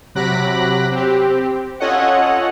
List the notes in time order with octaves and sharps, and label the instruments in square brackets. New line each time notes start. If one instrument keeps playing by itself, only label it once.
[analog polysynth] C3 F#3 B5 D6 F#6 A#6
C4 G4
C#4 F4 A4 C#5 D#5 F#5